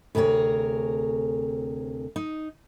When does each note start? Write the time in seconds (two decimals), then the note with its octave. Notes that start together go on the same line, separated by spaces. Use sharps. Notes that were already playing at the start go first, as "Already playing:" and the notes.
0.15 D2 C3 G#4 A#4 C#5
2.16 D#4